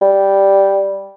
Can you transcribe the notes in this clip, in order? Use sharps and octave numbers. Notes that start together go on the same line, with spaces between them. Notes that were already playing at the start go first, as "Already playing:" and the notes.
G3